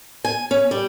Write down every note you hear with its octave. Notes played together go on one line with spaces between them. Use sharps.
G#5
C#4
G3